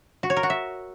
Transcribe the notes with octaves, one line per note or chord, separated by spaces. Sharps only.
F#4
C#5
A#4
F#4
E5